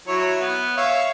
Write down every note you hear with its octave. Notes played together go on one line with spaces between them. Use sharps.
F#3 E4 C#5
B3
C#5 E5 F5